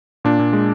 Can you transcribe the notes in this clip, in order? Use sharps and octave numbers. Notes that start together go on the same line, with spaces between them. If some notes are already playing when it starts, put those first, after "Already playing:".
A#2 D4
A#2
G#3